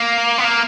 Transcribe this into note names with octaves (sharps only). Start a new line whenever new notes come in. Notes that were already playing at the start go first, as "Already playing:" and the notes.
Already playing: A#3
B3
A#3